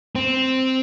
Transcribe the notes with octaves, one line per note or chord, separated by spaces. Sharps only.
C4